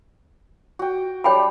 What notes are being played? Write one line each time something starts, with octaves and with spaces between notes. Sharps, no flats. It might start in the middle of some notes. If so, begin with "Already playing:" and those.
F#4 G5
G3 D4 C#5 G5 B5